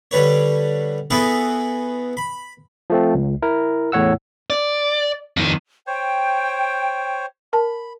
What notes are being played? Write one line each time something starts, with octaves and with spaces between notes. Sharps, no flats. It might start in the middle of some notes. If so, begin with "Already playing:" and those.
D3 G3 B4 C#5
B3 E4 F#4 G#4 A4 B4
B5
F3 A3 C4
C#2
E4 A#4
E2 A2 C#5 F#5 E6
D5
F2 D#3
C5 C#5 G5
A#4 A5 B5